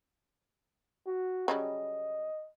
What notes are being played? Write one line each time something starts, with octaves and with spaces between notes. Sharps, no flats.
F#4
C#3 F#3 G3 D#5